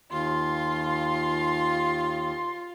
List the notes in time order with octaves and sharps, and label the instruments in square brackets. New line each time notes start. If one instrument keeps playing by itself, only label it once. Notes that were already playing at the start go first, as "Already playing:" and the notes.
[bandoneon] D#2 [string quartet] F4 [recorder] C6